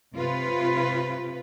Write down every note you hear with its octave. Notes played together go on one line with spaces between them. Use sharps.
C3 F4 B4